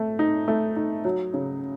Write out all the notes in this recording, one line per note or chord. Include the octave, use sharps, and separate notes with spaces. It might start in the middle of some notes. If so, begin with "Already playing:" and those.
Already playing: A3
D#4
A3
D#4
F#3
C#3